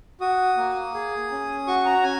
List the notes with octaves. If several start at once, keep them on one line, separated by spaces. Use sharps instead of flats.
F#4 D#6
A#3
G#4
C#4
F#4 C#6
A#5
C#4 G#5